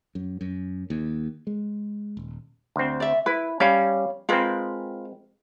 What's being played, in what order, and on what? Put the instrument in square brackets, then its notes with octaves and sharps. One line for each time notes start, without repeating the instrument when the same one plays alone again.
[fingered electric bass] F#2
F#2
D#2
G#3
D#1
[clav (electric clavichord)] D2 C4
[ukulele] D5 E5
[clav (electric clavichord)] E4 [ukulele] B4
[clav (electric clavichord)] G3 C#4 [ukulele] C#5 F5 B5
[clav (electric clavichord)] G#3 C4 [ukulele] F4 A#4 B4